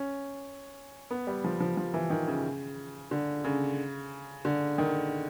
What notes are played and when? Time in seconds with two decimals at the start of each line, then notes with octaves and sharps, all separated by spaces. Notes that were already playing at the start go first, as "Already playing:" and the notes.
Already playing: C#4
1.11 B3
1.27 G3
1.44 F3
1.60 F3
1.77 F3
1.94 E3
2.10 D#3
2.27 C#3
3.11 D3
3.44 C#3
4.45 D3
4.78 D#3